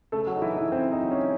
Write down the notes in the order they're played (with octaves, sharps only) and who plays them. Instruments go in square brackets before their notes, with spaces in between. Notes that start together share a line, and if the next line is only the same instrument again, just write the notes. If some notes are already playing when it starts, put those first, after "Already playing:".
[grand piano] C#3 A3 A4
F#3 F#4
D#4
E3 F#3 E4
E3 E4
C#3 C4 C5
D#4
F#3
C#4